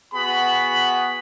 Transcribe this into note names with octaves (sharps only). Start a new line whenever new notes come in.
B3 F#4 G#4 B5